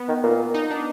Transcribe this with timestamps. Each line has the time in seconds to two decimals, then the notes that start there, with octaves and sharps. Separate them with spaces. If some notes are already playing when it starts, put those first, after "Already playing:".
Already playing: B3
0.08 D#3
0.23 A#2
0.54 D#4
0.70 D4